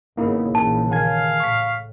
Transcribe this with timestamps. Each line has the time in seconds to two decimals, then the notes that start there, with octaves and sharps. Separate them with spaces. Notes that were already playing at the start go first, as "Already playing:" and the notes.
0.17 G#1 C#3 A#3 B3 D#4 E4
0.55 A#1 C#3 E3 A5
0.91 D#3 F5 G#5 G#6
1.40 A2 C#6 B6